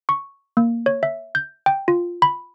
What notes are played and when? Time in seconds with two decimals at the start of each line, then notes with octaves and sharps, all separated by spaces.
0.09 C#6
0.57 A#3
0.86 C#5
1.03 E5
1.35 G6
1.66 G5
1.88 F4
2.22 B5